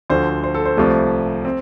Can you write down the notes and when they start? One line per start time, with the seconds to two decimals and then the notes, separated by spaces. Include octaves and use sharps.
0.10 D2 D3 F3 C5
0.44 C5
0.54 A4
0.65 C5
0.77 C2 C3 F3 A3
1.45 C4